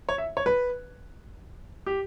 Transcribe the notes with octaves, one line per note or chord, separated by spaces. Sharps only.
C#5
E5
C#5
B4
G4